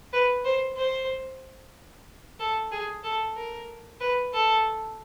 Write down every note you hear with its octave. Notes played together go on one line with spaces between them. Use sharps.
B4
C5
C5
A4
G#4
A4
A#4
B4
A4